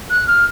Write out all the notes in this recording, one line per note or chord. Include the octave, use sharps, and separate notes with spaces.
F#6
F6